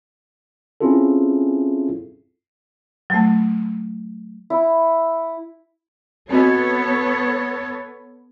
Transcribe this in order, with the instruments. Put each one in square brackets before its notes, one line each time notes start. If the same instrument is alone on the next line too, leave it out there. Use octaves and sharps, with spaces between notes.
[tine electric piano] C4 C#4 E4 F4 G#4 A4
[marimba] F#3 A3
[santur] E4
[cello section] B3 A4 C#5 [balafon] C4 F#4 D#5